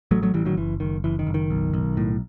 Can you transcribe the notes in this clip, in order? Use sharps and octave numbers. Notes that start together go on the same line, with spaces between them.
A1 F#3 A3
F#3 A3
A1 E3 G3
D#3 F#3
F#1 E3
F#1 D#3
F#1 E3
D#3
F#1
D#3
B1
B1
A2